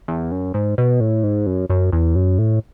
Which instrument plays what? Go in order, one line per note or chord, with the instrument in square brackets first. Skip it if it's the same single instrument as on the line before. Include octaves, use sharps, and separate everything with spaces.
[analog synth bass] E2
F#2
G#2
B2
A2
G#2
F#2
F#2
E2
F#2
A2